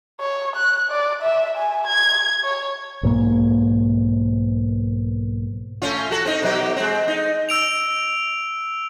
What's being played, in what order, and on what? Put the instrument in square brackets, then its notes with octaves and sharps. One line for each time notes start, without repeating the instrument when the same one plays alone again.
[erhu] C#5
F#6
D5
E5
G#5
G#6
C#5
[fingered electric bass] B1 G#2 A#3
[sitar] A3 C#4 F4
F#4 A4
C4 D#4
B2 F#3 G4
G#3 C4
D#4
[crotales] E6 D7 F7